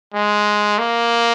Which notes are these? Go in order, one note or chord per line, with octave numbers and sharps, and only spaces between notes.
G#3
A#3